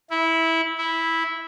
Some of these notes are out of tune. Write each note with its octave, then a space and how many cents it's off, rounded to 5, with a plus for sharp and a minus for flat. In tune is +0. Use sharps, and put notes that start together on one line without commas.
E4 -15
E4 -10